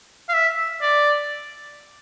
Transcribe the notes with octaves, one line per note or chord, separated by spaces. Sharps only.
F5
E5
D5